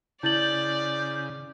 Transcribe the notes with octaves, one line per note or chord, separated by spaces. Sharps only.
C#3 E4 D5 G6 A6 F#7